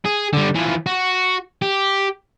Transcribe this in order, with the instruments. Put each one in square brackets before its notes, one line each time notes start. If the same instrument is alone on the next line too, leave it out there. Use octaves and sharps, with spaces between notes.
[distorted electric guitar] G#4
D3 G3
E3 F3
F#4
G4